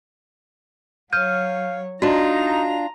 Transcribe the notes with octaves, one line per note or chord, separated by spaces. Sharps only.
F#3 C#5 F5 F6 G6 D#7
D4 D#4 F4 F#4 D#5 A#5